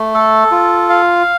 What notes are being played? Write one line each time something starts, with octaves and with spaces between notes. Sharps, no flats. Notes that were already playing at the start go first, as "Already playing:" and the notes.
Already playing: A3
A4
F4
F5